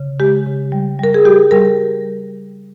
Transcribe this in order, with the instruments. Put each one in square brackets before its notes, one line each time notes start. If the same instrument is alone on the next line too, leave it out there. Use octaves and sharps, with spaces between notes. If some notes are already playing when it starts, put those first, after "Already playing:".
Already playing: [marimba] C#3
G#3 G4
C#3
G3
G3 A#4
G#4
G3 G4
G3 A#4